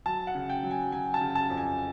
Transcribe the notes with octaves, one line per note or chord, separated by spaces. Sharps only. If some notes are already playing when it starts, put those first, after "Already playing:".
F#3 A5
F#5
C#3
G5
F#3
G#5
F#3 G#5
A5
C#3
A5
F2
G#5